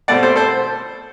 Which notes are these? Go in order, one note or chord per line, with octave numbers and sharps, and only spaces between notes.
B2 A3 C4 D5 F#5
A4 C5
A4 C5